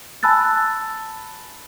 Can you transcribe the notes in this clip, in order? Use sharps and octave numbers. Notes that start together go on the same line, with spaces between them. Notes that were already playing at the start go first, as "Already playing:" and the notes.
G#5 A5 B5 E6 F#6 A6